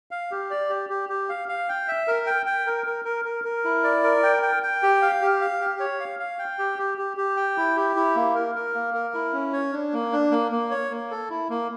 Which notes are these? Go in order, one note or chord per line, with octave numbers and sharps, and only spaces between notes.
F5
G4
D5
G4
G4
G4
F5
F5
G5
E5
A#4
G5
G5
A#4
A#4
A#4
A#4
A#4
E4
D5
A#4
G5
G5
G5
G4
F5
G4
F5
G4
C#5
F5
F5
G5
G4
G4
G4
G4
G5
E4
G4
E4
A#3
A#4
A#4
A#3
A#4
E4
C#4
C#5
D4
A#3
D4
A#3
A#3
C#5
A#3
A4
E4
A#3